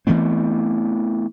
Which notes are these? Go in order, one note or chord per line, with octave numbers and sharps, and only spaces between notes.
E3 A3 B3 C4